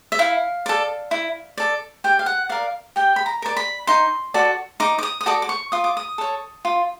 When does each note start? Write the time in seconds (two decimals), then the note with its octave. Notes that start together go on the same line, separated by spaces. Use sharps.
0.12 E5
0.19 E4 F5
0.66 A4 D5
1.11 E4
1.57 A4 D5
2.04 G4 G5
2.19 F5
2.26 F#5
2.49 A#4 D5 F5
2.96 G4 G5
3.16 B5
3.26 A#5
3.42 A#4 D5
3.57 B5
3.87 D#4 C6
4.34 F#4 A4 D5
4.80 D#4 D6
4.98 D6
5.03 D#6
5.21 D#6
5.26 F#4 A4 D5 D6
5.42 D6
5.49 C#6
5.72 F4 D#6
5.84 D6
5.97 D#6
6.18 A4 C#5
6.65 F4